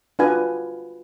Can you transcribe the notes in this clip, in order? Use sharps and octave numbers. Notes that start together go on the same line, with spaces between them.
D4 F4 F#4 B4 F5 G#5